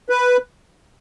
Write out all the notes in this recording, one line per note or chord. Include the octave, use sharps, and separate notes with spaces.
B4